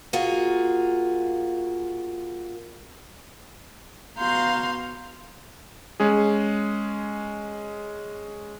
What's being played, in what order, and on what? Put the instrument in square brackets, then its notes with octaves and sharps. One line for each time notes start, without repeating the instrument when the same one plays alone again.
[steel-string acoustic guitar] A#3 F4 F#4 G#4
[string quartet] B3 F#4 F5 A#5 C6 G6
[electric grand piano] G#3 C#4 G#4